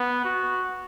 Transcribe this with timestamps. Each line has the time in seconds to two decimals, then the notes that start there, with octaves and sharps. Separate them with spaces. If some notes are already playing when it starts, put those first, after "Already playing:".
Already playing: B3
0.25 F#4